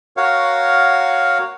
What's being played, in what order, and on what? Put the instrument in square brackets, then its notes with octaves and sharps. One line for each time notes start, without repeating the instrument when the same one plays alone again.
[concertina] F#4 A#4 C#5 F5 F#5